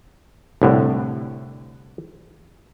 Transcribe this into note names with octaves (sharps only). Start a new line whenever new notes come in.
C2 A2 D3